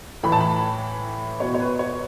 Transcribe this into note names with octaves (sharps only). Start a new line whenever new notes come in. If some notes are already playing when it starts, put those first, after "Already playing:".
A2 E3 B5
A5
B5
B2 C#5
C#5
B4
C#5